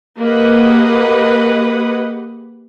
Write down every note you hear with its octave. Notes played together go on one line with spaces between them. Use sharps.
A#3 G4 G#4 B4 D#5 F#5